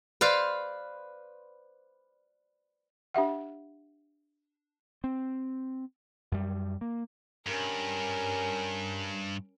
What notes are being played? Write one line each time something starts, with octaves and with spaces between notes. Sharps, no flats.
B4 C5 D5 F5
D4 G4 E5 F#5
C4
F#2 G3
A#3
G2 C#4 A#4